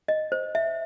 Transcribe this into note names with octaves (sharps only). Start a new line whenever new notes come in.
D#5
C5
E5